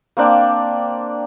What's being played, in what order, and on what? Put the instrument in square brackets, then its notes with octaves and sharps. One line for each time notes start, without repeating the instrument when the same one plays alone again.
[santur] A#3 C4 D4